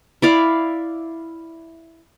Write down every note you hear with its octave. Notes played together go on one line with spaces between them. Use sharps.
E4 D5 F5